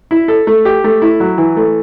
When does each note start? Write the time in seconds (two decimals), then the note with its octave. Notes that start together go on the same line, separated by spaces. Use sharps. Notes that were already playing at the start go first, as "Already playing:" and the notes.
0.11 E4
0.28 A4
0.47 A3
0.65 G4
0.84 A3
1.02 E4
1.20 F#3
1.38 E3
1.56 A3